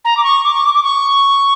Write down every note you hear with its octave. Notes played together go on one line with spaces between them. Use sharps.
A#5
D6
C#6
D6
C#6
D6
D6
C#6